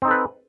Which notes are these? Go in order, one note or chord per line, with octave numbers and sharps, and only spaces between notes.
C4 D#4 A4 B4